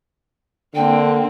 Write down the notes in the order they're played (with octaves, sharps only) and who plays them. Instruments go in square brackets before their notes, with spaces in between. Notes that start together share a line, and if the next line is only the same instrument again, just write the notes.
[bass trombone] D3 [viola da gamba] A#3 C4 [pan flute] G5